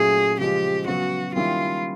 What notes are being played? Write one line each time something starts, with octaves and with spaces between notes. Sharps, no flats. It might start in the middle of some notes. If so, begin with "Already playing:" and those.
Already playing: A#2 F#3 A3 C#4 G#4
C#3 F3 G#3 G4
C#3 F#3 B3 F#4
D#3 G3 A#3 C#4 E4 F4